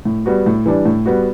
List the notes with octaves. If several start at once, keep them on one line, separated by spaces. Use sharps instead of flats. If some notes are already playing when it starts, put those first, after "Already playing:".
A2
G3 B3 F#4
A2
E3 G3 D4
A2
G3 B3 F#4